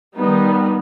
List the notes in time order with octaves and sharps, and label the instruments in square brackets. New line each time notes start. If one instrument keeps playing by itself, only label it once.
[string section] D#3 G3 B3 D#4